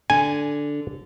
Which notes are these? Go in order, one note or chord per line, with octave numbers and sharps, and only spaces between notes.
D3 G#5